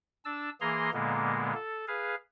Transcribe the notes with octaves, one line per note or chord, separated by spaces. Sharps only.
D4 A5 E6
E3 A#3 G#4 A#5 C6
A#2 D3 G#3 A#3 B3
A4
G#4 B4 F5